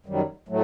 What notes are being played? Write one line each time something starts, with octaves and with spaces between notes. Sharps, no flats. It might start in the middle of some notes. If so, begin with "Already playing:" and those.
F#2 D#3 F#3 G3
A2 F#3 A3